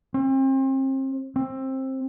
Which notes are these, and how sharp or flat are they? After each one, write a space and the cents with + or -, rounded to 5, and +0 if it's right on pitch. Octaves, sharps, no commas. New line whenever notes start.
C4 +35
C4 +20